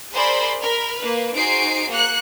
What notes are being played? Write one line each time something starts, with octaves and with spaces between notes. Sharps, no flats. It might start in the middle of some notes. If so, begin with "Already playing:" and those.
G#4 A#4 C5 D5 B5 C6
A#4 B5 F6
A#3 B4
D#4 F#4 G#4 C5 C7 D7
A#3 F#6 C#7